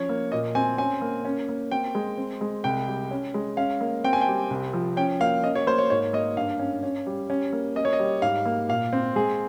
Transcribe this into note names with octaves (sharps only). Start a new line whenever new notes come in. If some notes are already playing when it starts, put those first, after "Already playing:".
Already playing: F3 C#4 C#5
A#3
A#2 D#5
C4 G#5
C#4 G#5
A#3
C#4
A#3
C4 G5
G#3
C4
G#3
C2 G5
G3
C#4
G#3
C#4 F5
A#3
C4 G5
G#5
G5
G3
C2
F3
C#4 G5
A#3 F5
C#4 D#5
C#5
A#3 C5
C#5
G#2 C#5
A#3 D#5
G2 F5
C#4
C#4
G3
C#4
A#3
C#4 D#5
C#5
D#5
G3
G#2 F5
A#3
A#2 F5
C4
G#3 G#4